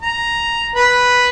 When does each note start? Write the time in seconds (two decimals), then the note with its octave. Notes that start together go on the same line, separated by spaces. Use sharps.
0.02 A#5
0.75 B4